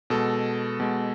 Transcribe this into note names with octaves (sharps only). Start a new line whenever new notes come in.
B2 G#3 A4
B2 G#3